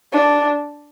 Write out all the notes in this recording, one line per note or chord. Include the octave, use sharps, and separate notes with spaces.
D4